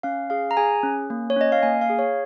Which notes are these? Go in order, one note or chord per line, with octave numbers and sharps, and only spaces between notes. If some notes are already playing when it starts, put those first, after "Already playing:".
C#4 F5
G#4 F5
A#5
G#4 G#5
C#4
A#3
C#5
C#4 D#5
F5
A#3 G#5
F5
G#4
C#5